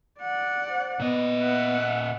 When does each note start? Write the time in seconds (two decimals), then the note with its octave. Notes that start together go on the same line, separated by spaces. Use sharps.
0.20 D5 F#5
0.70 C5
1.00 A#2 B3 D#5
1.39 E5 F#5